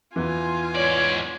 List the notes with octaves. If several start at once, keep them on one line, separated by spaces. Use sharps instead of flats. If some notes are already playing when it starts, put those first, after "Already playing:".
E2 E3 F4 G#5
G#2 C#5 D5